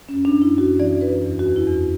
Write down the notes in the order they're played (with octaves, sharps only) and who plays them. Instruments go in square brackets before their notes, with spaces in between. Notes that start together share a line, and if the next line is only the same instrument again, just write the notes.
[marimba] C#4
F#2
D4
F#2
E4
F#2 F#4
E3 D5
F#2 B4
E2
F#4
E2
E4
E2